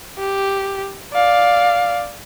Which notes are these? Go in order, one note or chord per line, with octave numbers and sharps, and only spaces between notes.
G4
D5 F5